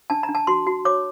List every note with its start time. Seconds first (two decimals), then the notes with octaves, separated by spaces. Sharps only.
0.10 D4 A5
0.23 A#5
0.29 D4
0.35 A5
0.47 F#4 C6
0.67 F#4
0.85 C#5 D6